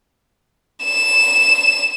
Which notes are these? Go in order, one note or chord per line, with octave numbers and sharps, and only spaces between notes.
E7